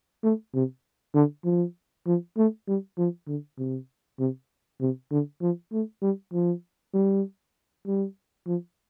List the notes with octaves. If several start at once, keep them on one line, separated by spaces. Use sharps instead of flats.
A3
C3
D3
F3
F3
A3
G3
F3
D3
C3
C3
C3
D3
F3
A3
G3
F3
G3
G3
F3